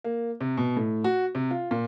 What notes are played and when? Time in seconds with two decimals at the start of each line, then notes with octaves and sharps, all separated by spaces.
0.04 A#3
0.41 C3
0.57 B2
0.77 A2
1.04 F#4
1.35 C3
1.51 F4
1.71 A#2